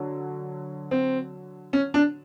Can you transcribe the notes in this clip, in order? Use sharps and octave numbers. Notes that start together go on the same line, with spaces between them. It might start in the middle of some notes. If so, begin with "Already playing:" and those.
Already playing: D3 F#3
C4
C#4
D4